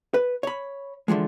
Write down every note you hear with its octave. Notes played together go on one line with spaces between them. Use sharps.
B4
C#5 B5
D3 E3 F3 G#3